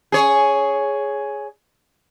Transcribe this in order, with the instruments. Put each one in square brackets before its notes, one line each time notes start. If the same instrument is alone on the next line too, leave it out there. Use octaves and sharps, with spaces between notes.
[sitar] G#4 C#5